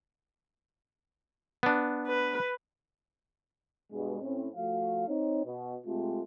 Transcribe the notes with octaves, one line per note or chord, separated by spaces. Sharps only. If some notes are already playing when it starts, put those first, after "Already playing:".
B3 D4
B4
G2 B2 G#3
A2 C4 C#4
F3 A3 F#4 F5
C4 D#4 C#5
B2
C3 G#3 A3 C4 F4 G4